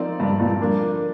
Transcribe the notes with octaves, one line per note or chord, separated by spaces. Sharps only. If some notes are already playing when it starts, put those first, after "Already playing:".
Already playing: F3 C4 D#4 A#4 D5
G2
G2 A#2
D3 F3 A#3 D4